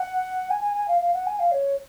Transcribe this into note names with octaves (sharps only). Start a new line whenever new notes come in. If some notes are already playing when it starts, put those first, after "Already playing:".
Already playing: F#5
G#5
G#5
G#5
F5
F5
F#5
G#5
F5
C#5